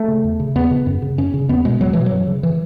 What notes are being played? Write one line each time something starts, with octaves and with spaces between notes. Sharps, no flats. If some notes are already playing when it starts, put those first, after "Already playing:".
Already playing: A3
C#3
E2
C#3
E2 B3
C#3
F#2
C#3
F#2 C#4
C#3
E2 B3
B2 G#3
E2 F#3
B2 E3
F#3
F#2
C#3
E3